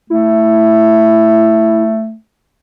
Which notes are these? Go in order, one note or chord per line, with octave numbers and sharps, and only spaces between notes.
A3 E4